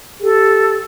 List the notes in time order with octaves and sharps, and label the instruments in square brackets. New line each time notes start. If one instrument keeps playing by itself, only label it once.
[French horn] G4 [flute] A4